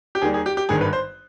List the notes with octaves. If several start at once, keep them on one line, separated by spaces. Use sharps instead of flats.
G4
D#2 D#3 G3 G#4
G#4
G4
G4
G#1 G2 D#3 G#3 G#4
B4
C5